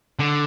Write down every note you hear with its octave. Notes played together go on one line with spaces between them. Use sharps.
D3